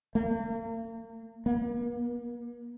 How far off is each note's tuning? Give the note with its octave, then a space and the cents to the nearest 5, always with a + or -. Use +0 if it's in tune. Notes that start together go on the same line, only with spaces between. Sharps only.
A#3 -40
A#3 +40